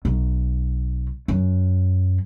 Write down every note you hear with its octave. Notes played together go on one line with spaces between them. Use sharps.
B1
F#2